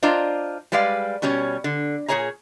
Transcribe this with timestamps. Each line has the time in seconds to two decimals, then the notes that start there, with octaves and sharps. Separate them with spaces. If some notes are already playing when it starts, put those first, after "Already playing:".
0.03 D4 F4 C5 D5 D#5 A#5
0.72 G3 G#3 B4 D5 F5
1.22 B2 G3 C#4 C#5
1.64 D3
2.08 A#2 G#4 C#5 G#5 A#5